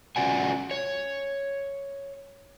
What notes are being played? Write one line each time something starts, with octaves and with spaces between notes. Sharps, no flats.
C#4 F4 F#4 D5 F#5 G#5
C#5